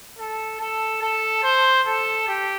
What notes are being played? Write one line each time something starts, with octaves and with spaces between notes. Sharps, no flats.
A4
A4
A4
C5
A4
G4